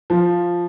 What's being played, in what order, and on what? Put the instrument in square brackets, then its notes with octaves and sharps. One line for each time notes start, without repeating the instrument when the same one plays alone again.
[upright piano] F3